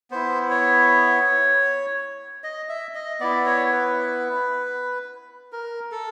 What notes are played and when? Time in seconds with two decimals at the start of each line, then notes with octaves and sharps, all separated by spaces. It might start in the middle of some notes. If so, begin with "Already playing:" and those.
0.11 B3 E4 C5
0.50 C#5
2.44 D#5
2.69 E5
2.95 D#5
3.20 B3 E4 D5
3.46 C#5
3.72 B4
5.52 A#4
5.91 A4